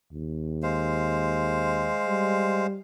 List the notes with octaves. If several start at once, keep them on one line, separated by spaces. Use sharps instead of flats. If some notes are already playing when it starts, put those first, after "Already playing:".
D#2
G#3 C5 F5
G3